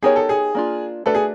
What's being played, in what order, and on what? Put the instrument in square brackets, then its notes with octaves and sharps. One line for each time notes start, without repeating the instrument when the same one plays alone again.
[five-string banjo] B3 D#4 G4 A#4 C#5 [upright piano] G#4
[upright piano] A4
G#4
[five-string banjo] A#3 D4 F4
[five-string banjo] A3 D4 F#4 B4 D5 [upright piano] A4
[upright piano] G#4